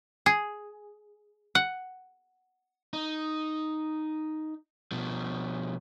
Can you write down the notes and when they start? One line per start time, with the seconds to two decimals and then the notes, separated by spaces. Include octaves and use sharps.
0.26 G#4
1.55 F#5
2.93 D#4
4.92 B2 F3